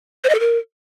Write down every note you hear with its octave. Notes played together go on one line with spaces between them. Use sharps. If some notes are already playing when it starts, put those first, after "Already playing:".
C5
D#5
A4
A#4